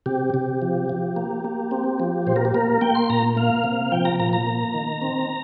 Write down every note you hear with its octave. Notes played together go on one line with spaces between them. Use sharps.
C3 G4
C3
F3
F3
A#3
A#3
C4
F3
A#2 C5
A#4
G4
A#3 A#4
A#3 G5
C6
A#2 A#5
A#3 F5
C3
F3 G5
A#5
A#2 A#5
A#5
A#3
D#3
C4